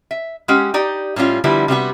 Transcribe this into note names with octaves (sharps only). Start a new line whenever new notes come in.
E5
G#3 C#4 G4 F#5
D#4 G4 D5
A2 G3 C#4 F4
D3 F3 G3 B3 E4
C3 G3 B3 F#4